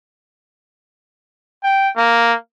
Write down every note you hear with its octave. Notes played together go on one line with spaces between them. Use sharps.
G5
A#3